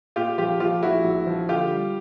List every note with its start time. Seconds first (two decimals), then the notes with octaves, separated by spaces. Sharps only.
0.16 A#2 F4 G4
0.38 F3 F4 G4
0.60 F3 F4 G4
0.82 A#1 E4 F#4
1.04 A#1
1.27 F3
1.49 D3 F4 G4
1.71 G3